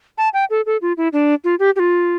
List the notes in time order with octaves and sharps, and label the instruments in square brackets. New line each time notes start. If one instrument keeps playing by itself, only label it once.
[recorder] A5
G5
A4
A4
F4
E4
D4
F4
G4
G4
F4